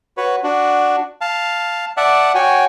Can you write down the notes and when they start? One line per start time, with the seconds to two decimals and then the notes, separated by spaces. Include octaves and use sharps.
0.17 F#4 B4 C#5
0.43 D4 F#4
1.21 F5 A5
1.97 D5 E5 F#5 A5
2.35 F#4 C#5 G5 G#5